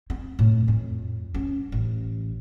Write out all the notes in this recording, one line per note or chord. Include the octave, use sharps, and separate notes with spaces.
C4
A2
F2
C#4
A1